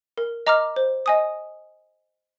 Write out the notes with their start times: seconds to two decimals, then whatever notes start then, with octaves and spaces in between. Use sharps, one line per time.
0.18 A#4
0.47 D#5 A#5 D6 F6
0.76 C5
1.06 D#5 G#5 D#6